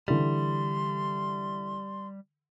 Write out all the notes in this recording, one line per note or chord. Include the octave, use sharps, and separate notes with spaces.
D3 E3 G3 C6